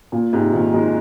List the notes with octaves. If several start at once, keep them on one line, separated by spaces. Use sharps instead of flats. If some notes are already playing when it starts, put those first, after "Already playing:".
A#2
G#2 C3
A#2 D#3
D#3 G#3